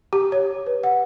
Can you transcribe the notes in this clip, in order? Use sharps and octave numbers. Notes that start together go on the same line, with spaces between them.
G4
C#5
B4
F#5